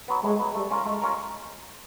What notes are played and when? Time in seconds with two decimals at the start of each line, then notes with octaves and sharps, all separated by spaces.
0.08 F#3 B3
0.24 A2 G#3
0.39 F#3 B3
0.55 G3 A3
0.71 C#4 F4 A#4
0.86 G#3 A3
1.02 C#4 F4 A#4